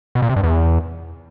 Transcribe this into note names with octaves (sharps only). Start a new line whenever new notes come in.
B2
A#2
C3
G2
E2